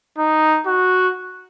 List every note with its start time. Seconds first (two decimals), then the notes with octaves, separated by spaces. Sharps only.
0.19 D#4
0.67 F#4